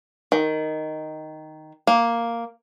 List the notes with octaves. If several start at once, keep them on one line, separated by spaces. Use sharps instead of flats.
D#3
A#3